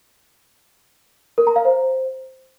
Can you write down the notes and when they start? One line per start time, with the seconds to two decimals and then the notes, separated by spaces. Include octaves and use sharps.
1.38 A#4
1.47 A#5
1.56 F5
1.65 C5